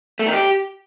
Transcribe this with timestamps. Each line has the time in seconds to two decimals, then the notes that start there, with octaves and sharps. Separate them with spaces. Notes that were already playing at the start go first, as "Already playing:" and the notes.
0.19 A3
0.26 D#3
0.33 G4